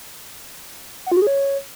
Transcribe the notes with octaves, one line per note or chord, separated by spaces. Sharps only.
F#5
F4
F#4
G#4
C#5